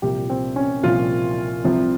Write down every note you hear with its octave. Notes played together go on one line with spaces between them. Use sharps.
C2 A#2 F3 G4
C4
C#4
C2 A#2 F3 F4
C2 C3 F3